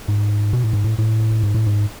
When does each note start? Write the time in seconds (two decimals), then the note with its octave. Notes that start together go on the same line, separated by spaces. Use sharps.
0.08 G#2
0.53 B2
0.64 A2
0.73 G#2
0.84 A2
0.98 A2
1.43 G#2
1.55 A2
1.66 G#2